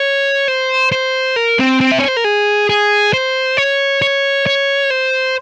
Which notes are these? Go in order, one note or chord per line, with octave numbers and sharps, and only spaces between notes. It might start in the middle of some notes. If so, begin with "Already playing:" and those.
Already playing: C#5
C5
C5
A#4
C4
C4
E5
C#5
C5
A#4
G#4
G#4
C5
C#5
C#5
C#5
C5